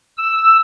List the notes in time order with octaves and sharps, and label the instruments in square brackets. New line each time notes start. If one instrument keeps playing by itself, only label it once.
[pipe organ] E6